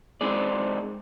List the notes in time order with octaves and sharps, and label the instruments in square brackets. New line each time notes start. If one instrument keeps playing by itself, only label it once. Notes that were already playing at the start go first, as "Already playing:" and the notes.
[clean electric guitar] G#3 C4 D#4 G#4 D5